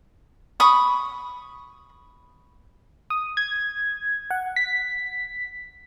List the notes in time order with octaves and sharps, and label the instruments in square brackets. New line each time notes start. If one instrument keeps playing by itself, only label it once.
[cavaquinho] B5 C#6 D#6
[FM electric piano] D#6
G#6
F#5
B6